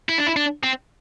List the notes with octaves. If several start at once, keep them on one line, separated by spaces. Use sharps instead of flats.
E4
D4
E4
D4
C4